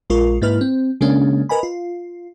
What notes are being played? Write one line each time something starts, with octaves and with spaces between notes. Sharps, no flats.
A#1 G#3 F4 A#4 C#6
G#2 A#3 E4 B4 F6
C4
C#3 G#3 A#3 C#4 D4
A#4 B4 D#5 G#5 B5
F4